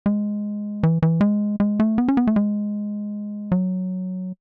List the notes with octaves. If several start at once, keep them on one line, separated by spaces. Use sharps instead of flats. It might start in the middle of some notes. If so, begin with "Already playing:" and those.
G#3
E3
E3
G#3
G#3
A3
B3
C#4
B3
A3
G#3
F#3